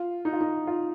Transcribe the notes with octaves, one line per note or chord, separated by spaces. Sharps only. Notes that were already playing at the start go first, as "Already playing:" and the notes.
Already playing: F4
D#4
F4
D#4
F4